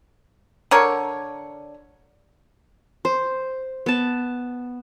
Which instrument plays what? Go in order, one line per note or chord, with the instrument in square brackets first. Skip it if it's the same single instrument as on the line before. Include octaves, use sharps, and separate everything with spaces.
[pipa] D3 A#4 C#5
[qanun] C5
B3 A5